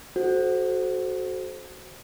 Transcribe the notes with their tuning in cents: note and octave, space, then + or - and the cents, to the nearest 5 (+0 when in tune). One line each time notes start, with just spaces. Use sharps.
F#4 +0 A4 -35 C5 +0